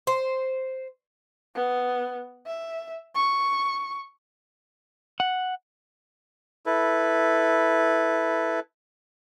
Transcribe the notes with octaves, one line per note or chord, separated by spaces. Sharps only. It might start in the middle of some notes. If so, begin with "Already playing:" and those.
C5
B3
E5
C#6
F#5
E4 A4 B4